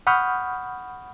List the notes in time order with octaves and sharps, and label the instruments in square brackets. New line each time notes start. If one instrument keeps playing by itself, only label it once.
[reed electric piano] F#5 B5 C#6 D#6 F6 G6